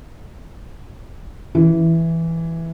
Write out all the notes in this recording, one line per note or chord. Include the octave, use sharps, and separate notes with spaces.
E3